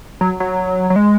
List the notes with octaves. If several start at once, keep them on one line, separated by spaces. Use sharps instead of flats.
F#3
F#3
F#3
G#3